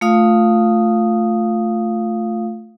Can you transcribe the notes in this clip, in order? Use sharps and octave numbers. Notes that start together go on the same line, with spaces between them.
A3 F4 F5 D#6